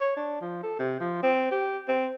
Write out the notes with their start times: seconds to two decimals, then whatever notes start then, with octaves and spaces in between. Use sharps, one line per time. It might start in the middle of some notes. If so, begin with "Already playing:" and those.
0.01 C#5
0.17 D4
0.41 F3
0.63 A4
0.79 C3
1.00 F3
1.23 C4
1.51 G4
1.88 C4